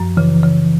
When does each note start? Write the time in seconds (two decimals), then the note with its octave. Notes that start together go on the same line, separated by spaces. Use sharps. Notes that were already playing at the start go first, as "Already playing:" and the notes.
Already playing: F#2 F3
0.17 C#3 E3
0.43 C#3